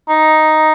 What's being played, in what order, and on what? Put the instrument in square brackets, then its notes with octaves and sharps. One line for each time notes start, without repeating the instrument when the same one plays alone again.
[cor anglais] D#4